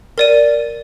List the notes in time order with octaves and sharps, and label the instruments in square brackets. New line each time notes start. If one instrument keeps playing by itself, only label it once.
[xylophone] A#4 D5 D#7